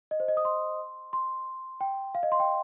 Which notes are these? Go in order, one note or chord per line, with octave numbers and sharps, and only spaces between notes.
D#5
C5
D#5
D#6
C6
C6
G5
F5
D#5
C6
G5